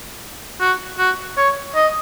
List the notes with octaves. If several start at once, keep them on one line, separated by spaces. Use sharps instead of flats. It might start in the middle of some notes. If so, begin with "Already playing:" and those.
F#4
F#4
C#5
D#5